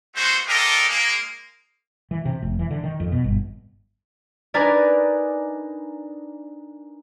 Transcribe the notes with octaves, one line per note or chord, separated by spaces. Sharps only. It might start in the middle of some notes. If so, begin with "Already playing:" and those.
G#3 A3 B3 F#4 C5
D4 F4 G4 A4 A#4 D#5
G#3 A#3
E3
C3
F1
E3
D3
D#3
F2
B2
G1
D4 D#4 A#4 B4 D5 G#5